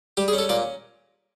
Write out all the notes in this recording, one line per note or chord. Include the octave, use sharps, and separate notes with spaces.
G3 G4
G#4
C#4
A4
A#2 D5